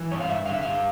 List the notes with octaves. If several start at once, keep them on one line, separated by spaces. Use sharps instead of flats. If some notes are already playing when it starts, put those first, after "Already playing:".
Already playing: E3
G2 C#5
F5
G2 E5
D3 F5
E5
G2 F5